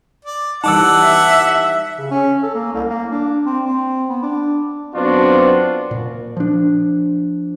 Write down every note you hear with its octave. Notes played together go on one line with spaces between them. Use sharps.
D5
E3 G3 D#4 F#5 A5 D6 E6
E5
C#3
C#4
A4
A#3
C2
A#3
D4
C4
C4
B3
D4
F#2 B3 C4 D4 F4 F#4
A#2
F3 D4